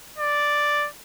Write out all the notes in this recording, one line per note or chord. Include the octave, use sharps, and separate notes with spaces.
D5